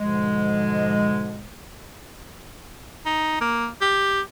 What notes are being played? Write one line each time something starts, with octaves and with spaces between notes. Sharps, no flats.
G#2 B2 D3 F3 G#3
D#4
A#3
G4